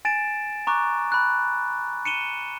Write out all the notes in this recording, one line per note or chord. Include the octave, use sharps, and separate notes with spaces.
G#5 A6 D7 E7
A#5 C#6 D6 F#6
B5 F#6
C#7 D#7 E7 G7